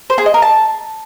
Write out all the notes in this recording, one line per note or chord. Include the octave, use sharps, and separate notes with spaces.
C5
G#4
D#5
A#4
A5